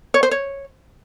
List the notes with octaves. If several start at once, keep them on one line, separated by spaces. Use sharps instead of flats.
C#5
C5
C#5